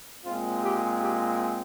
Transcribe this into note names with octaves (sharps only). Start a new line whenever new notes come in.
A#2 G#3 C4 F4
G4
G4